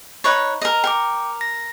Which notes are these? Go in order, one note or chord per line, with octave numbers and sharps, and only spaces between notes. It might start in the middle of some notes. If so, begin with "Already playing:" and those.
D#4 B4 C#5
A#4 D#5
A#4 G5 D6
A#6